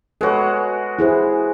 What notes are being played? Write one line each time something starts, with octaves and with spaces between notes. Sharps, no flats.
G#3 F#4 A4 B4 C#5
E4 G#4 C5